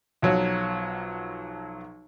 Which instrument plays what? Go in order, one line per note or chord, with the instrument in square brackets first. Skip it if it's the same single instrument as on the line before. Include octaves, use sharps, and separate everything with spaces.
[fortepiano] B1 F3 F#3 C#5